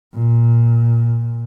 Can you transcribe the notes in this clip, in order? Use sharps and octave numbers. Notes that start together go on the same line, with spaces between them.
A#2